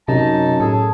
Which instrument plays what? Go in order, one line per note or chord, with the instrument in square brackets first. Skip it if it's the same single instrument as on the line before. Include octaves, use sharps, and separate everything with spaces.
[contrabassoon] F#2 [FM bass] C3 [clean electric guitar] D#4 [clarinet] A5
[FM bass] A2 [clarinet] G#4 [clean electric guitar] A4